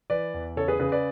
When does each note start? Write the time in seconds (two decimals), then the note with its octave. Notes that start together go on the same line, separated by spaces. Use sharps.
0.10 E3 B4 D5
0.34 E2
0.56 C#3 A4 C#5
0.68 G#4 B4
0.80 C#3 G#4 B4
0.92 B4 D5